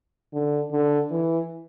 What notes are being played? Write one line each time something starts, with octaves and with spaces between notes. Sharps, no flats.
D3
D3
E3